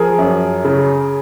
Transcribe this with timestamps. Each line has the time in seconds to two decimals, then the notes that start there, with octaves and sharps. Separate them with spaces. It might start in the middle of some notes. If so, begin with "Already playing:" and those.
Already playing: F3 G#4 A#4
0.18 F#2
0.65 C#3